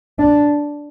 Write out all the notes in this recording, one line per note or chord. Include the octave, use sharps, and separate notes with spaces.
D4